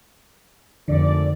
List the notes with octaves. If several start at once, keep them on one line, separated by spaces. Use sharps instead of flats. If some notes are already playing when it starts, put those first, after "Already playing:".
G#1 F2 D3 A3 D5